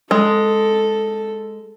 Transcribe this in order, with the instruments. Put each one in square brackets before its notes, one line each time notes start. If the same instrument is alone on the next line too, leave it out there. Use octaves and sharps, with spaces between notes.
[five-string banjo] G#3 [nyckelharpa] A4